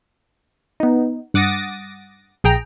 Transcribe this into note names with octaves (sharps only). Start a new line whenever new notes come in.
B3 D#4
G2 F#5 D6 D#6 A6 A#6
A#1 G#4 G5 A#5